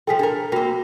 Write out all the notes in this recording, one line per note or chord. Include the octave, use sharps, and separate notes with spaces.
F3 G#4 A4 G5 B6
D4 A4 A#4
A#3 C4 F#4 G5